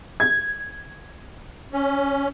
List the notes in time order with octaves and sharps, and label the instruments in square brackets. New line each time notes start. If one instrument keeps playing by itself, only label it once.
[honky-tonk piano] G#6
[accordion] C#4